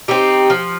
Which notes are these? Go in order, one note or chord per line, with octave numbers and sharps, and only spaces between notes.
C4 D#4 G4
F3